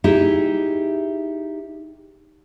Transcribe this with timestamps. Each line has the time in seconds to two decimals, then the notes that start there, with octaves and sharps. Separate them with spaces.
0.04 D#4 E4 G4 G#4 E5